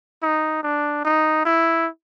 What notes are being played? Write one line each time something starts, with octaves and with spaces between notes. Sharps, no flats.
D#4
D4
D#4
E4